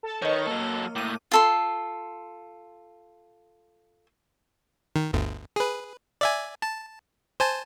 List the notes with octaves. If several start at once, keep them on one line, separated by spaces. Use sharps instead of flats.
A4 A5
D#3 B4 C#5 D#5 C#6
F#3 A#3 A4
A2 D6 D#7
F4 A4 C6
D#3
G1 D2
G#4 B4
D5 E5 G#5
A5
C5 G#5 A5